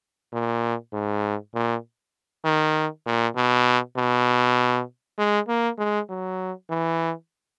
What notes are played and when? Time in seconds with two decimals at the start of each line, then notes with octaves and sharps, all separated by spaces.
0.33 A#2
0.93 G#2
1.55 A#2
2.45 D#3
3.06 A#2
3.36 B2
3.97 B2
5.19 G#3
5.48 A#3
5.79 G#3
6.10 F#3
6.70 E3